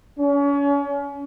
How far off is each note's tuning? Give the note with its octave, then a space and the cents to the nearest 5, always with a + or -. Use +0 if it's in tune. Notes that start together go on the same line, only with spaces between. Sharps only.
C#4 +35